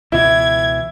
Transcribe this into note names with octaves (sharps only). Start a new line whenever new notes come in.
C#2 B2 E3 E4 G#6